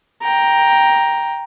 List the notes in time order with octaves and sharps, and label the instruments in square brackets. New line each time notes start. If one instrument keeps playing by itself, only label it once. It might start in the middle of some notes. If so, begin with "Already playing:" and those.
[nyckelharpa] G5 A#5